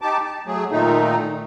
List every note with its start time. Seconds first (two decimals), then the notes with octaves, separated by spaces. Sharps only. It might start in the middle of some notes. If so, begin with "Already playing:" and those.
0.02 D#4 G4 A5 D6
0.25 A5
0.46 F#3 A3 G#4
0.71 A#2 D#3 A3 D#4